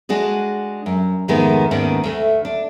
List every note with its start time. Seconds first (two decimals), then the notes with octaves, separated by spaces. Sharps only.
0.09 G#3 D4 F#4 G#4
0.86 F#2
1.28 F2 G#2 D#3 G#3 A3 B3
1.71 D#2 G#2 D#3 B3 C#4 D4
2.04 D2 A3
2.45 D4